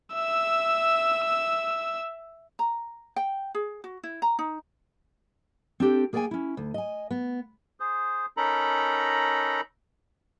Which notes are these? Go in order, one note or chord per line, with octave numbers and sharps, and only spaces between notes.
E5 E6
A#5
G5
G#4
F#4
E4
A#5
D#4
C4 D4 G4 A4
A#3 G#4 D5 E5 G5 G#5
C#4 E4
D2
D#5 G#5
B3
G#4 C5
C#4 D#4 A4 A#4 A#5 B5